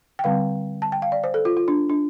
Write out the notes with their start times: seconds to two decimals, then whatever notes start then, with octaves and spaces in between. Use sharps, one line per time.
0.19 G5
0.24 D3 G3 C4 F5
0.82 A5
0.92 G5
1.02 F5
1.12 D5
1.24 C5
1.34 A4
1.45 F4
1.57 F4
1.68 D4
1.89 D4